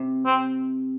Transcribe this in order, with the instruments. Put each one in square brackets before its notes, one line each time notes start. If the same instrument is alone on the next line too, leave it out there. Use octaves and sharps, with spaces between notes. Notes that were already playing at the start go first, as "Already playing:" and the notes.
Already playing: [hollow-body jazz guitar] C3
[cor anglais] C4